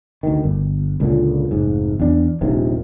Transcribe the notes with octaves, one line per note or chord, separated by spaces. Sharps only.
D2 D#3
G1
C#2 A#2 D3
F1 G#2
E2 D4
D#1 A#1 D#2 C3